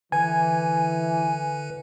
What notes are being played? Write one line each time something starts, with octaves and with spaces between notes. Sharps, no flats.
D3 E3 B4 G#5